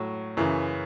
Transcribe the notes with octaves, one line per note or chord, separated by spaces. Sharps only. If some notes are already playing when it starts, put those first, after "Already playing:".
Already playing: A2 F#3
F#2 C#3 E3